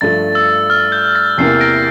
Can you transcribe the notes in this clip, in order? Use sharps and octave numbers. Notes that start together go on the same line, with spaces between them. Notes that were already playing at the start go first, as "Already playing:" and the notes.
G2 F3 A3 A6
E6
F6
G6
A6
E2 C3 E3 A#3 C7
A#6 D7